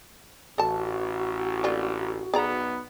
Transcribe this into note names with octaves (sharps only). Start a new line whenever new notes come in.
A1 F#4 A4 A5
D3 A#3 F4
B1 B3 G#4 D5 A#5